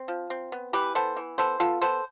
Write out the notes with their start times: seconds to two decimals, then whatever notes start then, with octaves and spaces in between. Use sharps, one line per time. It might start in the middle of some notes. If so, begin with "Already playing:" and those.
Already playing: C4
0.08 F3
0.30 C4
0.52 B3
0.73 E3 G4 B4
0.95 B3 A4 C5
1.17 E3
1.38 B3 A4 C5
1.60 B3 F4 A4
1.81 B3 A4 C5